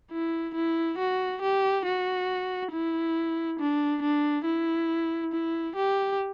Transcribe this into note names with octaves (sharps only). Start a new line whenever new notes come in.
E4
E4
F#4
G4
F#4
E4
D4
D4
E4
E4
G4